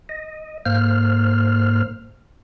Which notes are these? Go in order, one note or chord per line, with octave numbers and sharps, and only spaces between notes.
D#5
G#2 A#3 C5 F6